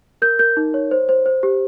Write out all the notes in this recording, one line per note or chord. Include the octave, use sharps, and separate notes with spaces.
A#4 G6
A#4 G6
D#4
C#5
C5
C5
C5
G4